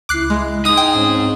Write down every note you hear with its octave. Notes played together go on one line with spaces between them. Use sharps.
C#2 E4 D6 F#6 C7
G#3
D#4 G#4 D#6
G5
G#2 C4 C#4